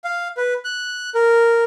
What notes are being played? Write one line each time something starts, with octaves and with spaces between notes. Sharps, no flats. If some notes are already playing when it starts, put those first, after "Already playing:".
F5
B4
F#6
A#4